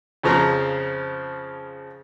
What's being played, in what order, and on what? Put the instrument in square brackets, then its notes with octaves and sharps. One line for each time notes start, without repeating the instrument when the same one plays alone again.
[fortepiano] F2 C#3 F3 A#5